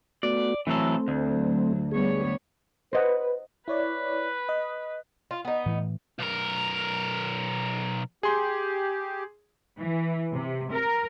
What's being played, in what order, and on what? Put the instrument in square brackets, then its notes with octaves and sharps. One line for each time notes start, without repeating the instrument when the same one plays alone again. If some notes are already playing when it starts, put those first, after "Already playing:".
[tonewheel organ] A3 B3 F#4 [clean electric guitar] D5
[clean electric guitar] E3 F#3 A4 [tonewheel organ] A3 C4
[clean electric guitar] D2 [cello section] F#3
[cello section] G3 B3 C#5 [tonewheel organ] G#4
[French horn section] B4 [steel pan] C5 D#5 F#5
[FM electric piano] E4 C#5 D5 [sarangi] B4
[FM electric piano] D#5
[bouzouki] F4
B3 D#4
[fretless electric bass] A2 E3
[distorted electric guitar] B1 A#4
[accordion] G4 [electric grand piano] G#4 C6
[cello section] E3
C3
A#4